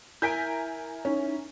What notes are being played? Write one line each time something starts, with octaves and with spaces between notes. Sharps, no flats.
E4 A#4 E5 G#5 A#5 G6 B6 D7
C#4 D#4